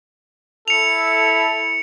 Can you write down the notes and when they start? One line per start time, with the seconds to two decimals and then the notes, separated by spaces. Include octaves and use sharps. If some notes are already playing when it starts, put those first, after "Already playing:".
0.68 E4 A4 C#7 F7